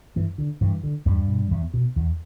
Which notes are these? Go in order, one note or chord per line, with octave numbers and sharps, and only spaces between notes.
G2 E3
D3
G2 E3
D3
E2 G2 G3
B2
E2
B2
E2